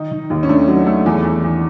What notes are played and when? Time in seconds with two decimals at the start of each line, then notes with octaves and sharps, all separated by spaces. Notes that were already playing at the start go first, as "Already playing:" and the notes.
Already playing: D#3 D#4
0.11 D#3
0.30 D#2
0.43 C#4
0.49 A3 D4
0.68 F#3
0.86 A3
1.06 E2
1.24 E2
1.44 E2